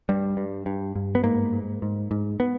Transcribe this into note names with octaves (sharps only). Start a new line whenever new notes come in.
G2 G3
G2
G2
G2
B3
G#2 A#3
G#2
G#2
G#2
B3